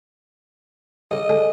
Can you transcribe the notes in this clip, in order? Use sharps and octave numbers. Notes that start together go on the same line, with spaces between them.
G2 C#3 D#5
D3 G#3 D4